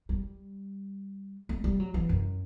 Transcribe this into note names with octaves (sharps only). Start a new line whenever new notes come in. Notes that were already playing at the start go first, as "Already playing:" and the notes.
G3
A3
G3
F#3
E3
F#2